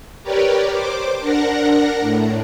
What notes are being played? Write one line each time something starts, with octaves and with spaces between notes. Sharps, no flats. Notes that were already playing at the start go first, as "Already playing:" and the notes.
G4 A#4 B4 C#5 D5
C5 D6
D4 A#4 F#5 A#5
A2